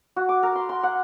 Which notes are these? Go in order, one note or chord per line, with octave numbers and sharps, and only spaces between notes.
F#4
D6
A#4
C6
C6
F#5